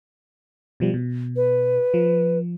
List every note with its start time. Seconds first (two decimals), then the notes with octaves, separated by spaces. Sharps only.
0.80 B2 F3 G3
0.94 B2
1.36 B4
1.94 F3